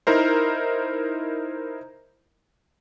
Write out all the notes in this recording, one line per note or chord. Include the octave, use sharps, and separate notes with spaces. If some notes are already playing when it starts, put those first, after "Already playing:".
D#4 E4 A#4 C5